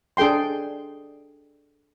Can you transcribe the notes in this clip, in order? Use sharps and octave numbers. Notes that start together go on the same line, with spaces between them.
D4 G#4 A4 G5 C6